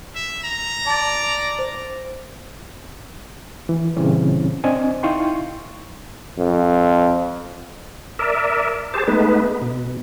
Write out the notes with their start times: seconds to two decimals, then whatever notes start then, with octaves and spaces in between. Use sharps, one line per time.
0.15 E5
0.44 A#5
0.87 D5 A5 A6
1.59 C5
3.69 E3
3.97 A#2 C#3 E3 G3 C4 C#4
4.64 C4 D4 D#5 G#5
5.03 D#4 E4 F5 G5 C6 C#6
6.38 F2
8.19 A#4 D5 E5
8.94 G4 G#4 C5 A5
9.08 G#3 A3 B3 D#4 B4
9.62 B2